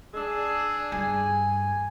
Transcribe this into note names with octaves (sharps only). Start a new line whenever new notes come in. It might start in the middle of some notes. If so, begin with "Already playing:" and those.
D4 G#4 E6
G2 G#5